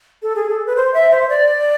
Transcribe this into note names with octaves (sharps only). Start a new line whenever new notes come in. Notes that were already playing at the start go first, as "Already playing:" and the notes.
A4
G#4
A4
B4
C5
E5
C5
D5